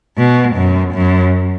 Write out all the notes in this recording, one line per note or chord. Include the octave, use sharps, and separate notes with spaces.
B2
F#2
F#2